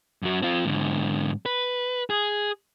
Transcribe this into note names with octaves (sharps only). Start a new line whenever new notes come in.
F#2 F#3
C4 F4
G#2 D3
B4
G#4